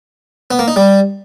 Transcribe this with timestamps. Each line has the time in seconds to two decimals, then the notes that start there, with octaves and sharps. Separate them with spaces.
0.51 B3
0.59 A#3
0.68 D#4
0.76 G3